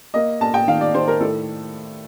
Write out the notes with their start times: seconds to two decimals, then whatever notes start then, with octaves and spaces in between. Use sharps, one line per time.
0.14 A#3 D#5
0.41 A#3 A5
0.54 G5
0.68 D#3 F5
0.81 D5
0.94 D#3 C5
1.08 A#4
1.20 A2 A4